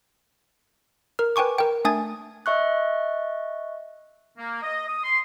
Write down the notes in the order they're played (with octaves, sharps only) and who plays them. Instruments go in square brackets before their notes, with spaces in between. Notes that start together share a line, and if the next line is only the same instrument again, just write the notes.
[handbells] A#4 F6
B4 G5 G#5 C#6 D6
A#4 G5
A3 D4 G#5 D#6 G#6 A6
[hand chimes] D#5 E5 C#6 F#6
[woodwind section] A#3
D#5
D#6
C6